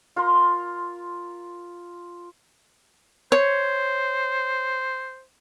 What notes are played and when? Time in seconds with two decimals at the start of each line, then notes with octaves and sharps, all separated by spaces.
0.16 F4 A#4 A#5 C6
3.32 C5 C#5